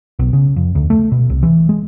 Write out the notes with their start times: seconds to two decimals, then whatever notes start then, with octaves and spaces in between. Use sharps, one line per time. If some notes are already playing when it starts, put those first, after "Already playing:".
0.19 B1
0.33 C#3
0.56 F2
0.75 D2
0.90 A3
1.12 B2
1.30 C2
1.43 E3
1.69 G#3